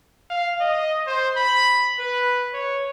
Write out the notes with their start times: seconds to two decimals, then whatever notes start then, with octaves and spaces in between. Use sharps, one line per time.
0.30 F5
0.60 D#5
1.07 C5
1.37 B5
2.00 B4
2.54 C#5